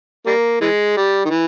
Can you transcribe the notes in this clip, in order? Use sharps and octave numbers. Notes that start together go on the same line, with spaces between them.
G3 A#3
E3 G#3
G3
D#3
E3